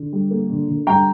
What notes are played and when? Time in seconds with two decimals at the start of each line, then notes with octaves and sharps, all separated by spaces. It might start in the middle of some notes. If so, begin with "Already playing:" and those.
Already playing: D3
0.13 G3
0.31 A#3
0.50 D3
0.68 D3
0.87 G3 G5 A#5